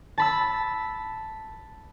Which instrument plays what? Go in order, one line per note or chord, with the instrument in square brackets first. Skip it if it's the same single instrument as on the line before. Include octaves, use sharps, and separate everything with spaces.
[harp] A5 B5 E6